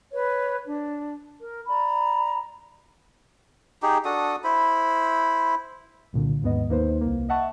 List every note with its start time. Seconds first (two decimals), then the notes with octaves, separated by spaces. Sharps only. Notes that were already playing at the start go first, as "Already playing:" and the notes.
0.12 B4 C#5
0.65 D4
1.39 A#4
1.67 D5 A#5 B5
3.83 D#4 G4 G#4
4.05 D4 F#4 A4 D#6
4.44 E4 C5 B5
6.13 C2 A#2 D3
6.42 D#2 G#2 B3 D#5
6.69 D#2 A#3 D#4 B4 C5
7.01 C2 A#3
7.29 D#5 E5 F#5 A5 C#6